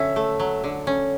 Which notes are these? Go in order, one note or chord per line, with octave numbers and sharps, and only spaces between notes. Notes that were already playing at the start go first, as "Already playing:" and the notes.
Already playing: D3 F#3 C#4 E5
A3
F#3
D3
C#4